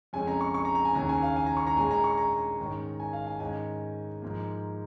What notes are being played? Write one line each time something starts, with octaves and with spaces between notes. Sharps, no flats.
F2 C#3 G#3 C#4 G#5
A#5
C#6
C#6
A#5
A#5
G#5
D#2 C#3 A#3 C#4 A#5
G#5
F5
G#5
A#5
C#6
A#5
A#2 G#3 C#4 G#5
A#5
C#6
A#5
G#2 D#3 C#4
G#5
F5
G#5
G#2 D#3 C#4 G#5
G#2 F3 A#3